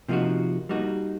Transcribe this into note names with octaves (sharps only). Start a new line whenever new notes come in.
C3 F3 A#3 D#4 F#4
G3 A#3 D#4 F#4